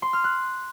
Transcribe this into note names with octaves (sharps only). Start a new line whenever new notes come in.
C6
F6
F#6